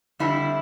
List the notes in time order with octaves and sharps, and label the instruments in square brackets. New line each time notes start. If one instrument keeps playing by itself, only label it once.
[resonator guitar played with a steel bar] F2 D3 G3 C4 E4